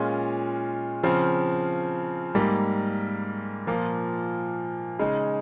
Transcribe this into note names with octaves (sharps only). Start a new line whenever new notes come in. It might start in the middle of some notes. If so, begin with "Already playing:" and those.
Already playing: A#2 G#3 C#4 F4
C#3 F3 C4
G#2 G3 A#3
A#2 F3 A#3
C#3 G#3 D#4